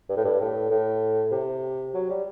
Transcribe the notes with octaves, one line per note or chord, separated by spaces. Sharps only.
G2
A2
G2
A2
A2
C3
F#3
G3